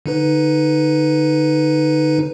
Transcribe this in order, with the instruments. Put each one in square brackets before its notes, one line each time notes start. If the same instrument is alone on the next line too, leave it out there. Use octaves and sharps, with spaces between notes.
[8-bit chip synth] D3 D#4 B4